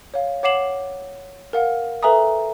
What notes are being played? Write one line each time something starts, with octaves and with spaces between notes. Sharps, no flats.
C#5 F5
C#5 F#5 D6 C7 E7 F#7
A#4 F5 F#5
A4 B4 E5 G#5 A#5 D#6